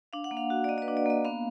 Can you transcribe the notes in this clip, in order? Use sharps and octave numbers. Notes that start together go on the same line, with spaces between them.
D4 F5
F#5
A#3
F5
F#4
D5
A#3 D#5
D5
B4
D4
D5
A#3 D#5
B3 F5